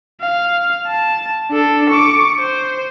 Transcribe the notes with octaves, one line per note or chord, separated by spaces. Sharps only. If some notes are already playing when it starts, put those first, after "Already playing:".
F5
A5
D4 A4
C#6 D6
C5